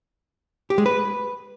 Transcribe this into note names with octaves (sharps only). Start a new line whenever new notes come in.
G4
G#3
B4